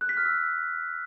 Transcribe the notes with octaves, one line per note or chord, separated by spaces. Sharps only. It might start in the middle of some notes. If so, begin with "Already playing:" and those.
F#6
B6
F6
E6